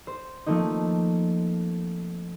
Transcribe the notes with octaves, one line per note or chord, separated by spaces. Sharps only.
C5
F3 A3 A#3 C4 D#4